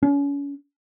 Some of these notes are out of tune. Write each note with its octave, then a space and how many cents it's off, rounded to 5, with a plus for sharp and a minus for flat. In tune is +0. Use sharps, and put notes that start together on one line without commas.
C#4 +35